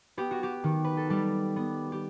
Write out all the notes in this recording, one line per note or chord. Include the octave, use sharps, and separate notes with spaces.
B3 G4
F#4
G4
D#3
B4
A4
G3 G4
B3
G4